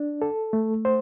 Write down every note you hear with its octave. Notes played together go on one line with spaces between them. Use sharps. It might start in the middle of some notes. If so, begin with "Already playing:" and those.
Already playing: D4
A4
A3
C5